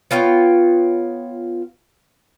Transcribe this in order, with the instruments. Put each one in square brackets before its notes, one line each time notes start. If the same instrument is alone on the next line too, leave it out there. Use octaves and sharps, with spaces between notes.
[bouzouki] B3 F4 C#5 G5